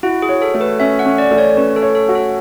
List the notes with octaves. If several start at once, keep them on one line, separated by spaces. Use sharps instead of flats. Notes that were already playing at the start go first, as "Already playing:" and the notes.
E4 F#4
G#4
C#5
A4
A3
B4
C#4 E5
F#5
C#4
D5
A3
C#5
C#4 B4
A4
C#5
A4
F#4
A4